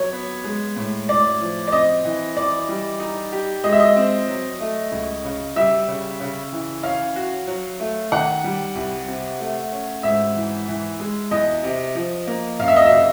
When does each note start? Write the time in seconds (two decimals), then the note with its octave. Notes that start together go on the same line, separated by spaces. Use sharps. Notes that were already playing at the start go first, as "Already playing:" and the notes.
Already playing: F#3 C#5
0.12 B3
0.44 G#3
0.76 A2
1.09 A2 D5
1.41 F3
1.67 D5
1.72 C4 D#5
2.04 E3
2.36 E3 D5
2.69 G3
3.00 D#4
3.32 G4
3.64 G#3 D#5
3.72 E5
3.80 D#5
3.96 C4
4.28 F#3
4.60 A3
4.92 C#2
5.24 C#3
5.56 G3 E5
5.88 C#3
6.20 C#3
6.52 E3
6.83 C#4 F5
7.16 F#4
7.47 F#3
7.80 A3
8.12 D#3 F#5
8.44 G3
8.75 C2
9.08 C3
9.39 A3
9.72 C#4
10.03 G#2 E5
10.36 E3
10.68 E3
11.00 G#3
11.31 E2 D#5
11.64 C3
11.95 F3
12.27 A#3
12.59 F#2 F5
12.68 E5
12.76 D#5
12.86 E5
12.91 C#3